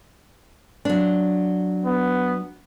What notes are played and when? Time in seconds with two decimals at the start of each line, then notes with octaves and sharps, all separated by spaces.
0.85 F#3 D4
1.85 B3